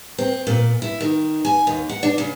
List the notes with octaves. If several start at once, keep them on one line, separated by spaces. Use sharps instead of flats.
C4
A#2
E4
D#3
G#5
D#2
F#5
D4
C#3